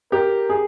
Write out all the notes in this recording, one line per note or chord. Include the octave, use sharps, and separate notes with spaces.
G4 A#4
G#4